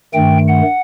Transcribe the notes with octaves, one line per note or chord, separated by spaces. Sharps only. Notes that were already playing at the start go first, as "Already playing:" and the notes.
G2 D#3 A3 G5
F#5